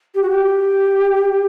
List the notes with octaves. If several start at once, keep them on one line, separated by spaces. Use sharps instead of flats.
G4
F#4
G4